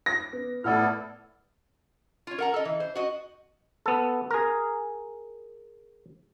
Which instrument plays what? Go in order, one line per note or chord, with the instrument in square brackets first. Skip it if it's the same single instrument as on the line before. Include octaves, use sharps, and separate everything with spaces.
[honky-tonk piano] A#6
[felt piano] B3
[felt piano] A2 [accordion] B3 E4 A4 [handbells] D5 F#5 F6
[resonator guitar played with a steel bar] F4 C#5
A#4 F#5 A#5
A4 D#5
E3
C5
F#4 D#5
[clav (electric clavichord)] B3 A4
G#4 A#4